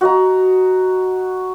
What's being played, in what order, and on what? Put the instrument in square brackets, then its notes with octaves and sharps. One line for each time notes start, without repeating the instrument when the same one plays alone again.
[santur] F#4 D#5 A#5